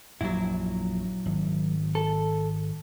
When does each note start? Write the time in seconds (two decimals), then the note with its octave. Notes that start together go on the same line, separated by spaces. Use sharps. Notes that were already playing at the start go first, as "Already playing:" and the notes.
0.21 A#1 F#2 F#3 E4
1.26 G#1
1.95 A4